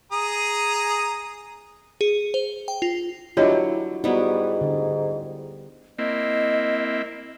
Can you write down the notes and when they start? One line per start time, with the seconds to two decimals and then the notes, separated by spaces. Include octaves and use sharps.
0.12 G#4 A#5 D#6
2.01 G#4
2.34 C5
2.68 G5
2.82 F4
3.37 F#3 D4 E4 F4 G4 C#5 D#5
4.04 G#2 G3 B3 D#4 E4 F#4
4.61 D3
5.99 A#3 C4 E4 D#5